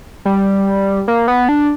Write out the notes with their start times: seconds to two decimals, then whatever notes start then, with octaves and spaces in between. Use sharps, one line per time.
0.25 G3
1.08 A#3
1.28 B3
1.49 D4